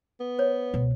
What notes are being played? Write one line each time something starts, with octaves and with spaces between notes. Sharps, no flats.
B3
C5 C#5
C#2 B2